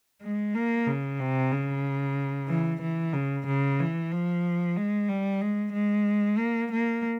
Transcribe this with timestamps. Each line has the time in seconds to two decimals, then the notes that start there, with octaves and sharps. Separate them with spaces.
0.22 G#3
0.54 A#3
0.86 C#3
1.20 C3
1.52 C#3
2.48 E3
2.81 E3
3.13 C#3
3.46 C#3
3.79 E3
4.11 F3
4.76 G#3
5.08 G3
5.41 G#3
5.73 G#3
6.38 A#3
6.71 A#3